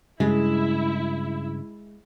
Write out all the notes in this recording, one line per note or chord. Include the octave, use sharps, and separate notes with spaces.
G2 C#3 G#3 E4